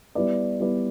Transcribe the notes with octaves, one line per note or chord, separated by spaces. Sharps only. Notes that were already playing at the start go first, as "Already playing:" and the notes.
G3 B3 E4 B4 D5
G3 B3 E4 B4 D5